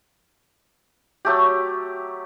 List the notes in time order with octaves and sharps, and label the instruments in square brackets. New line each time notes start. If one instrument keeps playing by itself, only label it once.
[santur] F#3 A3 G4